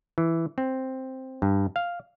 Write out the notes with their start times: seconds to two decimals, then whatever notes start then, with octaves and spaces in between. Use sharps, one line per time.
0.18 E3
0.58 C4
1.42 G2
1.76 F5